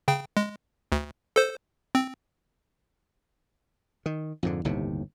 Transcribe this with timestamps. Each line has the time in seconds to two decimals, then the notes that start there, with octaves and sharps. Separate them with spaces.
0.08 C#3 G5
0.37 G#3
0.92 D2
1.36 A4 C5
1.95 C4
4.06 D#3
4.43 F2 G#2 D3
4.65 G1 D#2 A2 C3